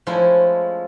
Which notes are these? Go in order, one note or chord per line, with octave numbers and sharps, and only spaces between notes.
F3 G#3 A3 C#4 E4